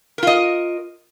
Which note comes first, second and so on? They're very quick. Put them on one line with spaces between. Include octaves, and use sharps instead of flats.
A#4 F4 D#5